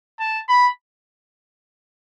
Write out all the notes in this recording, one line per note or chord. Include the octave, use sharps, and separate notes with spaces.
A5
B5